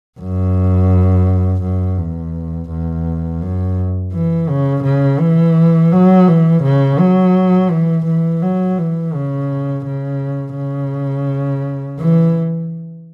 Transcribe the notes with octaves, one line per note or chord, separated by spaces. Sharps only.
F#2
F#2
E2
E2
F#2
E3
C#3
C#3
E3
F#3
E3
C#3
F#3
E3
E3
F#3
E3
C#3
C#3
C#3
E3